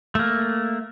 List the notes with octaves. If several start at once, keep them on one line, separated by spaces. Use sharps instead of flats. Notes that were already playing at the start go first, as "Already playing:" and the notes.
A3 A#3